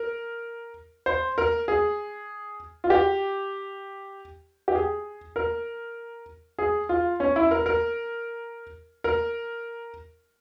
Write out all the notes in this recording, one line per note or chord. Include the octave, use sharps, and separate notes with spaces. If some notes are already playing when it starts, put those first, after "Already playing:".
Already playing: A#4
C5
A#4
G#4
F4
G4
G4
G#4
A#4
G#4
F4
C#4
E4
A#4
A#4
A#4